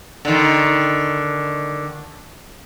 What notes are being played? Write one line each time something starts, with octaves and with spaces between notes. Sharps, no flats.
D3 D#3